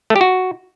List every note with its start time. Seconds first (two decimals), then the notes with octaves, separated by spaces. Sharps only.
0.10 A3
0.16 G4
0.21 F#4